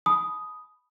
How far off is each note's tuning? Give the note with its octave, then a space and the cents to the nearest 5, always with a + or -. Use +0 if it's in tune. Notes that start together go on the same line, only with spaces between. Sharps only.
G#5 +45 B5 +0 D#6 +0